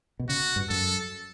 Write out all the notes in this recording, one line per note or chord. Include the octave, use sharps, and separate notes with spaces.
B2
C#3 F#4
G2
F#2 A4